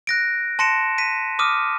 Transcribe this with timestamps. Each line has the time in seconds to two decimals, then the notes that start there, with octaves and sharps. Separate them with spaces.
0.07 F#6 A#6 D7
0.59 A5 C6 A#6 C#7 D7 E7
0.98 B6 D#7
1.39 D6 D#6 F6 D#7